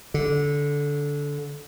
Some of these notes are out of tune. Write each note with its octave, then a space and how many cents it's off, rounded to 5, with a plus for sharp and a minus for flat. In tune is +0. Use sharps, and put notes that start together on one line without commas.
D3 -15